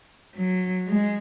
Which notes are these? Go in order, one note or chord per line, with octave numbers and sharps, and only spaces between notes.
F#3
G#3